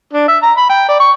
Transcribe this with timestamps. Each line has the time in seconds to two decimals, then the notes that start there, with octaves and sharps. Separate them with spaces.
0.13 D4
0.28 E5
0.43 A#5
0.58 B5
0.69 G5
0.88 D5
1.00 C#6